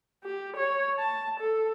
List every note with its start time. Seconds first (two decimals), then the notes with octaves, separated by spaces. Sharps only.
0.24 G4
0.57 C#5
0.99 A5
1.40 A4